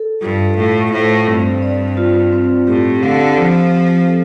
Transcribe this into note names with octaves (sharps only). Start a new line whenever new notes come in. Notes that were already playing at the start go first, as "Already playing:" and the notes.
Already playing: A4
G2 F4
A2 F5
A2 C5
G2 C4
D5
F4
C4
A2 G4
D3 F5
F3 G4
C4
A4